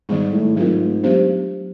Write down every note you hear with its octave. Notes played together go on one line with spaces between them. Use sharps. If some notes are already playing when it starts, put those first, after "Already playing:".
G#2 D#3 G3 B3 D#4
A2
G#2 F#3 A3 C4 F4 A#4
F#3 B3 D4 G4 C5